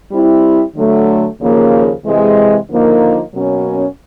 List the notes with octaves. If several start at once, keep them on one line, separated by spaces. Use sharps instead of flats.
G3 C4 E4
D3 F#3 A3
D#2 C#3 F3 A#3
C3 E3 G#3
D3 F3 A#3 D#4
B2 F#3 A#3 C#4